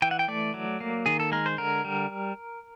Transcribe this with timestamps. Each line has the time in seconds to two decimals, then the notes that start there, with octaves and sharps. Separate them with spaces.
0.02 E3 G5
0.11 F#5
0.19 G5
0.28 A3 D5
0.54 F#3
0.81 A#3
1.06 D#3 G#4
1.20 A4
1.32 G#3 A#4
1.46 C5
1.58 D3 A#4
1.85 G3